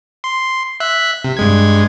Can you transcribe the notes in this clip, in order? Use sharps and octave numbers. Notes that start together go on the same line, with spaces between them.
C6
E5 F#6 B6
C3
G2 G#3 G#6